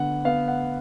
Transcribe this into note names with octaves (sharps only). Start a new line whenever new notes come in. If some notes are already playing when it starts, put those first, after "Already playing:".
Already playing: D3 B3 F#5
B3 F5
F#5